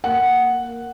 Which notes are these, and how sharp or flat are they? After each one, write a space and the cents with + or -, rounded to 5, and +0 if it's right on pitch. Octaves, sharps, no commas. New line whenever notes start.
A#3 +0 F#5 +0